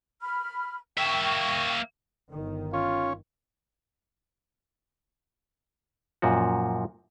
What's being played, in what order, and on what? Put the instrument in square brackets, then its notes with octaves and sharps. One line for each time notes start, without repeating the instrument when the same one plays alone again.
[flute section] B5 F6
[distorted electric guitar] A#3 E5 [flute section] G5 C#6
[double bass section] G1 D#3
[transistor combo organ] C#4 [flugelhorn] F4
[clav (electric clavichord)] F#2 A#2 F3 F#4